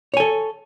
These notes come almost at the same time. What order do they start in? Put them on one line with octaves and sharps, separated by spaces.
C#5 G#5 A4